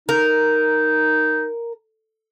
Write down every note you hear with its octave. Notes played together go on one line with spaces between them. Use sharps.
D#4 A#4